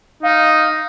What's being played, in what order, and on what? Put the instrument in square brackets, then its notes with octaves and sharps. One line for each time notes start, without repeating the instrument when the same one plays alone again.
[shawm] D#4 [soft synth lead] F5